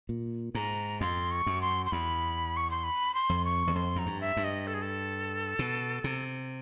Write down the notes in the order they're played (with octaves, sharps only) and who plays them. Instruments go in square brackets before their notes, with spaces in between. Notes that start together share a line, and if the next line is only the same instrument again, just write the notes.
[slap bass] A#2
[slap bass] G#2 [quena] A#5
[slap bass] F2 [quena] C6
[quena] C#6
[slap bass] F#2
[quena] C6
C6
[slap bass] E2 [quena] B5
[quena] C#6
C6
B5
C6
[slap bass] F2
[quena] C#6
[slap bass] E2
[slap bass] F2 [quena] C6
[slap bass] F#2 [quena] A#5
[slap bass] G2
[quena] E5
[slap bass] G2
[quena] D#5
A4
G#4
A4
[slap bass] B2
C3